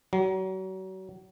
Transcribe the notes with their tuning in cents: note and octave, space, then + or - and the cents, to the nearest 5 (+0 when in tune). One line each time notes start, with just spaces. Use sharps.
F#3 +35